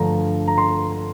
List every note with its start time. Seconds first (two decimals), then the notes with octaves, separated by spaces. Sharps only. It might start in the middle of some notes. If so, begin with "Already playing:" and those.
Already playing: G2 D3 F3 A3 A#5
0.48 A#5
0.58 C6